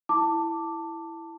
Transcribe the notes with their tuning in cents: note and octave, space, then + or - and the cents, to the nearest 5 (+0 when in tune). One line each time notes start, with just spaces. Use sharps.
E4 +5 A5 +15 D6 +0